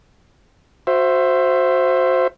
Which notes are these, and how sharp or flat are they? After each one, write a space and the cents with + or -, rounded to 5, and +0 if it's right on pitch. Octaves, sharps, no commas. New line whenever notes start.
F#4 -15 C5 +0 E5 +15